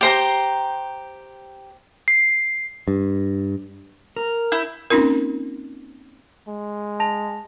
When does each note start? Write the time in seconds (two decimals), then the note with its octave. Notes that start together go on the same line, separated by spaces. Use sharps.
0.01 G4 C5 A#5
2.08 C7
2.88 G2
4.16 A#4
4.52 E4 G6
4.90 A#3 C4 C#4 D#4 F4 A#4
6.48 G#3
7.00 A5 A#6 F7